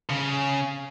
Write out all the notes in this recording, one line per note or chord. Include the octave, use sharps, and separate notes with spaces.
C#3